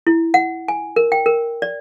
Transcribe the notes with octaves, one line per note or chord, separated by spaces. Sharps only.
E4
F#5
G#5
A#4
G5
A#4
D5